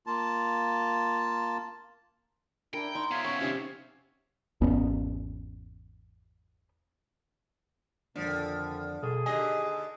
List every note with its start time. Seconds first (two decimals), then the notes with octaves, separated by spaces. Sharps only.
0.07 A#3 F4 A5
2.74 D4 E4 A#4 G5
2.95 D#4 C6 C#6
3.11 F3 B3 C#5 E5 F5
3.24 C#4 C#6
3.41 C3 C#4 D#4 C#6
4.61 G#1 E2 B3 C#4
8.16 F2 D3 D#3 F3 D4
9.03 B2 G#4 A4 D#6
9.26 D#2 D3 G4 D#5 G#5